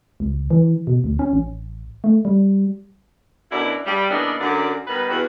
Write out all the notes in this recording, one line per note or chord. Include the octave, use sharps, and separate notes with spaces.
C#2
E3
B2
D2
C#4
A1
A3
G3
F#2 B2 D4 E4
G3
C#3 E3 A#3 B3 D4 D#4
F#2 D3 D5
D#3 G3 B3 B4
E2 F#4